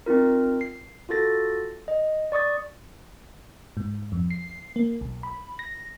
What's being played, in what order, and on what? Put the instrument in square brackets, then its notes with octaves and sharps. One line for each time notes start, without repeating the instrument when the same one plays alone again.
[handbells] C4 D#4 F4 A#4
C7
F4 F#4 A4 A6 A#6
D#5
D5 C#6 D#6 A6
[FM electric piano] G#2
F2
C7
A#3
B1
B5
A#6